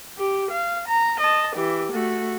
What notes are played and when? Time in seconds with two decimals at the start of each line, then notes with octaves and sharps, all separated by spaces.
0.18 G4
0.51 F5
0.88 A#5
1.20 D#5 A5
1.55 E3 G4
1.93 A3 F#4